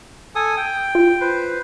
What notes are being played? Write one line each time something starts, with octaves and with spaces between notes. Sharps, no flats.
A4 G#5 D#6
G5
F4
B4 C5